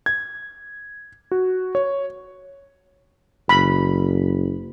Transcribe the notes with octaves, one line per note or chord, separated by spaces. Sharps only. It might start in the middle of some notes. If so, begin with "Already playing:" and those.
G#6
F#4
C#5
F#1 B5